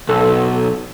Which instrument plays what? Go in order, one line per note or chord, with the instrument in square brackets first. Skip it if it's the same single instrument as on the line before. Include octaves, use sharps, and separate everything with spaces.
[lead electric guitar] B1 [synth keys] A4